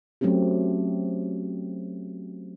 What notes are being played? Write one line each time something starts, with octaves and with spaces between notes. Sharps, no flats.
F#3 A3 C4 C#4 G4